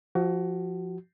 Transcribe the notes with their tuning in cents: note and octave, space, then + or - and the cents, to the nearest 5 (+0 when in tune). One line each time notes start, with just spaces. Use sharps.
F3 +0 F#4 +25